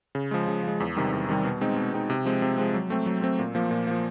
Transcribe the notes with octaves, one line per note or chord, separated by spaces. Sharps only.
C#3
F3 G#3
C#3
F3 G#3
E2
C3 D#3 G3
E2
C3 D#3 G3
B2
G#3 C4 D#4
B2
G#3 C4 D#4
C3
F3 G#3 C4
C3
F3 G#3 C4
F#3
A3 C4
F#3
A3 C4
A#2
F3 A#3
A#2
F3 A#3